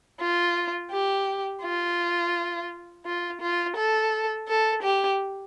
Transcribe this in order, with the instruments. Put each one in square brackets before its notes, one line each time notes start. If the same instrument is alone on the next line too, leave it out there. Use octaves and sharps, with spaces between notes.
[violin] F4
G4
F4
F4
F4
A4
A4
G4